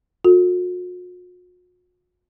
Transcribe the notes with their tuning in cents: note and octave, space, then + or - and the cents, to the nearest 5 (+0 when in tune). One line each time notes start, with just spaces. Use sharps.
F#4 -45 A4 +30